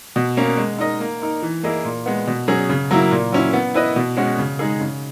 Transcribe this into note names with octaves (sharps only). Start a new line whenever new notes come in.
B2
A#3 C#4
G#3
D#4 A#4 D#5
A#3
D#4 A#4
E3
A#3 E4 G#4 D#5
A#2
G#3 B3
B2
F#3 C#4 G#4
C#3
F#3 A#3 E4
A#2
F#3 C#4 E4
B3
E4 B4 D#5
B2
G#3 C#4 F#4
C#3
G#3 D#4 G#4
C#3